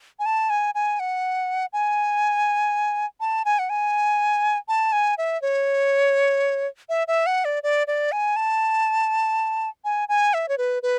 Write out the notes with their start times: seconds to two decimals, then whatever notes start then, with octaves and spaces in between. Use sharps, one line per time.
0.19 G#5
0.26 A5
0.50 G#5
0.75 G#5
1.00 F#5
1.73 G#5
3.20 A5
3.45 G#5
3.59 F#5
3.70 G#5
4.68 A5
4.92 G#5
5.18 E5
5.42 C#5
6.89 E5
7.08 E5
7.26 F#5
7.45 D5
7.63 D5
7.87 D5
8.12 G#5
8.36 A5
9.84 G#5
10.09 G#5
10.34 E5
10.49 C#5
10.58 B4
10.83 B4